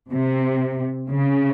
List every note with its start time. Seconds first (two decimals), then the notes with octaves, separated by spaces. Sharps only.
0.11 C3
1.09 C#3